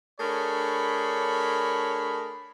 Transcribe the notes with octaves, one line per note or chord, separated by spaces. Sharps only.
A3 D4 G#4 A#4 C#5 B5